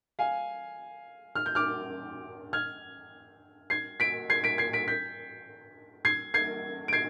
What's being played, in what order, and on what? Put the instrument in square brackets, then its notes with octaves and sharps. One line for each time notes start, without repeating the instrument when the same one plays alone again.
[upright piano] F5 G#5
F6
G6
D6 F6
F6 G#6
G#6 C7
B6 D7
G#6 C7
B6 D7
G#6 C7
B6 D7
G6 B6
G#6 C7
G#6 C7
D7
G#6 C7